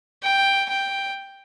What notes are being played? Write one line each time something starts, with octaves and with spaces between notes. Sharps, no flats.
G5
G5